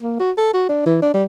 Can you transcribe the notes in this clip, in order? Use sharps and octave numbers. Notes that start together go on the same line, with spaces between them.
A#3
F#4
A4
F#4
D4
E3
D4
G3